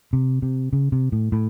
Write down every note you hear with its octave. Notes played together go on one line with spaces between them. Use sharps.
C3
C3
C#3
C3
A2
A2